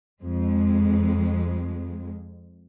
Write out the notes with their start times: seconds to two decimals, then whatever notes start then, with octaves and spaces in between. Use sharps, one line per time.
0.20 F2 G#3